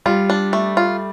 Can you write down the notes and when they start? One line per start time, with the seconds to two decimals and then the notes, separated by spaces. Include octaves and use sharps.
0.06 G3 F4
0.30 D4
0.53 A3
0.77 F4